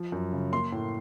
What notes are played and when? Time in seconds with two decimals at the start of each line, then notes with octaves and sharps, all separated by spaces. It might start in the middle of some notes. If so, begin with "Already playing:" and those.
Already playing: F3
0.12 F#2
0.33 C#3
0.52 A#3 C6
0.72 A2